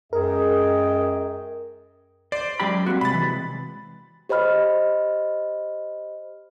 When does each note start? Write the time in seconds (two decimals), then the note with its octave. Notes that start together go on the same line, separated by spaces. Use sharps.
0.13 F#2 G#3 G#4 A#4 D#5 G5
2.32 C5 D5
2.60 F#2 G#3 G4 G#4 B5
2.86 G3 A#3 C4 F#4
3.01 C3 G#3 B5 A6
3.14 E3
4.29 G4 C5 D#5 B5 F6